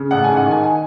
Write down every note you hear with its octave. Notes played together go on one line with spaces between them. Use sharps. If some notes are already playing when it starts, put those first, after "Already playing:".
Already playing: C#3
A1 F#5
G#2 G#5
F#5
D#3 G#5
G#5